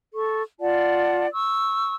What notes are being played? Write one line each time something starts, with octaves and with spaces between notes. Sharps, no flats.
A4 C#6
F4 D5 F#5 A5
C#6 E6